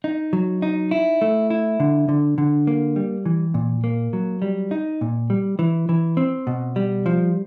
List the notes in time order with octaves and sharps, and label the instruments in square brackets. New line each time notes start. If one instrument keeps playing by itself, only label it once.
[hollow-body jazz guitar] D#4
F#3
D#4
E4
A3
E4
D3
D3
D3
A#3
G3
E3
A#2
A#3
F#3
G3
D#4
A#2
G3
E3
E3
C4
B2
G3
F3